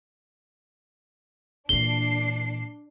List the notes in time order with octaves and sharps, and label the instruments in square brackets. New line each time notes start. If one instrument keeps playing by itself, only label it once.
[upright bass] A#2 E3 [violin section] D4 C7 [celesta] G7